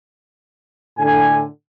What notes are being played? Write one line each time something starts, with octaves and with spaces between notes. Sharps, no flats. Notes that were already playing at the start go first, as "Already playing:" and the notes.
A2 D3 G#5